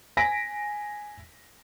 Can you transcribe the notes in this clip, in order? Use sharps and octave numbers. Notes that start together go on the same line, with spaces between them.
G#5 A#6 B6 D7